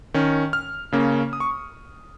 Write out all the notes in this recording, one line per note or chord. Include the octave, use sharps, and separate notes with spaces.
D#3 C#4
F6
C#3 A#3 C#4
D#6
C#6